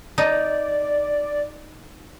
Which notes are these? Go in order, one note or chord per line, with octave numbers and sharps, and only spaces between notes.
D#4 D5